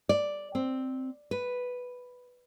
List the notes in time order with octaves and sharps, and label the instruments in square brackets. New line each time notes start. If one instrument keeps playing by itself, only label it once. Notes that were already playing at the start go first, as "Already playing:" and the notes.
[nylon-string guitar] D5
C4
B4